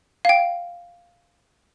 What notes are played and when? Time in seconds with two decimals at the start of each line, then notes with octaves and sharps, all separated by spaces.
0.25 F5
0.29 G5